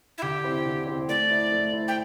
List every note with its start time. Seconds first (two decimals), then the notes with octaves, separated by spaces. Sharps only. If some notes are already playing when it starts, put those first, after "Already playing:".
0.18 E4
0.22 D3 G4
0.44 C4 E4 C5
0.66 D3
0.87 C4 E4 C5
1.08 A3 D5
1.30 E4 C5 E5
1.52 A3
1.73 E4 C5 E5
1.88 G5